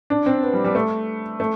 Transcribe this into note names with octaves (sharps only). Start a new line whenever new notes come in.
D4
C4
B3
G3
G3
A3
A3